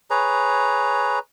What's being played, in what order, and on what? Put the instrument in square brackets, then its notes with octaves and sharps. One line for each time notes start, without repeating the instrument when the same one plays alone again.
[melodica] G#4 B4 C#5 A#5